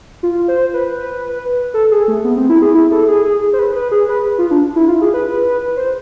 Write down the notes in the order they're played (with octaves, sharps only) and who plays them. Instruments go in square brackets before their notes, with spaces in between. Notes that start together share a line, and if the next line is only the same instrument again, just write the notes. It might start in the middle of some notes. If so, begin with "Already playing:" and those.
[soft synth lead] F4
C5
B4
A4
G#4
A3
B3
C4
E4
G#4
E4
A4
G#4
G#4
C5
B4
B4
G#4
B4
F4
D4
E4
F4
G#4
B4
C5